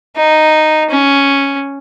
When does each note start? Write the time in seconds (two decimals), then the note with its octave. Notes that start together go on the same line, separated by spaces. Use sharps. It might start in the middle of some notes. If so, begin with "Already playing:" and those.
0.17 D#4
0.90 C#4